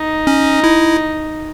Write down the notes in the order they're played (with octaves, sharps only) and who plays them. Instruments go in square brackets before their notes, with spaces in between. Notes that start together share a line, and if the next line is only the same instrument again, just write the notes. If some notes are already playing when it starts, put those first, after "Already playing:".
Already playing: [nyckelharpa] D#4
[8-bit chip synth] C#4
E4